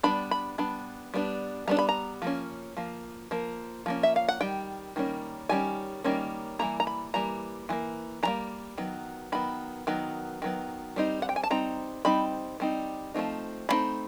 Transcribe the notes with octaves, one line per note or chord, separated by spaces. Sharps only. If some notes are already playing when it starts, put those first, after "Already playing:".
G3 B3 D4 B5
B5
G3 B3 D4 B5
G3 B3 D4
G3 B3 D4 A#5
B5
A#5
F3 A#3 C#4
F3 A#3
F3 A#3
F3 A#3 C#4
E5
F5
F#5
D#3 G3 G5
D#3 G3 A#3 C#4
D#3 G3 C#4 G#5
D#3 G3 A#3 C#4
E3 G3 A#3 A#5
A#5
B5
E3 G3 A#3 A#5
E3 G3 A#3
E3 G3 A#3 A#5
D#3 F#3 B3
D#3 F#3 B3 B5
D#3 F#3 B3
D#3 F#3 B3
G3 C4 D#4
F#5
G5
G#5
A5
G3 C4 D#4 A#5
G3 C4 D#4 B5
G3 C4 D#4
F3 A3 C4 D#4
F3 A3 C4 D#4 B5